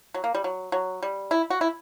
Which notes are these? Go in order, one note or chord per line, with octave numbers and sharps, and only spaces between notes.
F#3
A#3
G3
F#3
F#3
G3
E4
F#4
E4